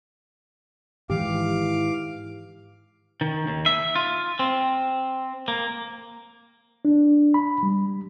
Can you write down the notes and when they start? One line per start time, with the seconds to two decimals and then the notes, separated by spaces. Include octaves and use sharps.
1.10 G#2 D#3 E3 G#3 G4 F5 D6
3.21 D#3
3.47 D#2
3.66 E5
3.96 F4
4.39 C4
5.48 A#3
6.85 D4
7.34 B5
7.63 G3